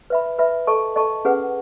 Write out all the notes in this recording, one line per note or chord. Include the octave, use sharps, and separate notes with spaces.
B4 E5 B5
B4 E5 B5
A4 D#5 A5 C#6
A4 D#5 A5 C#6
C#4 G#4 B4 F#5